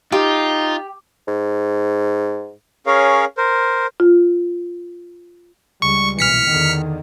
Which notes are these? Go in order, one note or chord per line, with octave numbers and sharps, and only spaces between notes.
D#4 F4 G4
G#2
C#4 G#4 A#4 C#5 F5
A#4 C5
F4
C#2 G3 C#6
B1 A#2 E3 F6 B6 C#7
E2 D3 D#3